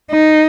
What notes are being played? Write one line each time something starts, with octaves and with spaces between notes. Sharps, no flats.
D#4